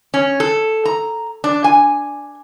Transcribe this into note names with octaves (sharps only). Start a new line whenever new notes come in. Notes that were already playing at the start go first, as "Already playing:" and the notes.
C#4
A4
A#5
D4
G#5